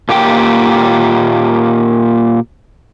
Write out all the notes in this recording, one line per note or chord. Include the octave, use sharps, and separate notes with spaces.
A#2 A#3 G4 G5